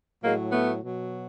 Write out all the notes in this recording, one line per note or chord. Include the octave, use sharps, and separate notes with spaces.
A2 F#3 G#3 A#3
A3 B3
B2 F#3